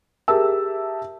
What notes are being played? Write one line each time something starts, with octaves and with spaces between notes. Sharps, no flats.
G4 G#4 A#4 E5 A5 E6